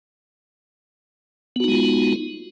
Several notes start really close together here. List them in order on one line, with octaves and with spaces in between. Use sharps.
B3 F#4 D#4 G#3 F4